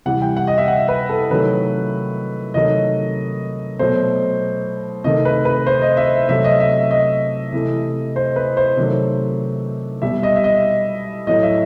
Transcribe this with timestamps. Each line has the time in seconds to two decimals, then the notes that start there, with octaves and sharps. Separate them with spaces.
0.06 C3 E3 G3 F#5
0.22 G5
0.37 F#5
0.47 D#5
0.58 E5
0.68 F#5
0.88 B4
1.09 A4
1.30 C3 D#3 F#3 A3 B4
2.54 C3 D#3 F#3 A3 D#5
3.79 B2 F#3 A3 C5
5.04 C3 D#3 A3 D#5
5.25 B4
5.45 B4
5.67 C5
5.82 D#5
5.97 E5
6.29 C3 F#3 A3 E5
6.44 D#5
6.60 E5
6.91 D#5
7.53 C3 E3 A3
8.16 C5
8.36 B4
8.57 C5
8.77 C3 D#3 F#3 A3
10.02 B2 G3 E5
10.23 D#5
10.36 E5
10.44 D#5
11.27 A2 F#3 A3 D#5
11.43 E5